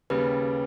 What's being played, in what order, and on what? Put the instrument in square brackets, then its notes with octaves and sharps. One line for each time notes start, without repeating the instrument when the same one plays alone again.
[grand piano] D#2 C#3 G3 [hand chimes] B4